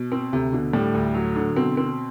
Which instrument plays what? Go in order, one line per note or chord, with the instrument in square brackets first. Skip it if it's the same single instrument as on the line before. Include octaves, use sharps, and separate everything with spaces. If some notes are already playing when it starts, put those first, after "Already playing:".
Already playing: [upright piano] B2
[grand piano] C4
[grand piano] D2 [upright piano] C3
[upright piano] B2 [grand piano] D3
[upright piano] A2 [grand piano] G3
[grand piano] D2
F#3
D3
[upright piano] B2 [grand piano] C4
[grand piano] C4